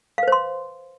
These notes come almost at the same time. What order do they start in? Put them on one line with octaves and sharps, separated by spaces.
F5 B4 C5 C6